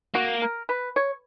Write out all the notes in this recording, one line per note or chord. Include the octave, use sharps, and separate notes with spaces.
A#3 F#4
A#4
B4
C#5